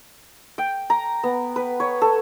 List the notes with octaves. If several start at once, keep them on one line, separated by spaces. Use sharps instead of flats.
G5
A#5
B3
B4
C#5
A4